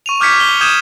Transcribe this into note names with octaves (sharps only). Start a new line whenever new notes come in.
C#6 D#7 F7
D6 F6 G6 G#6 B6 C#7
G7
D#6 G6 G#6 D#7 E7